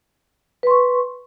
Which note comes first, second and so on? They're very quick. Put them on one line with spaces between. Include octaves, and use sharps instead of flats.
B4 C6 C#6